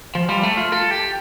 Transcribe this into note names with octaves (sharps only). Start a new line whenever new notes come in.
F3
G3
A3
F4
A4
G4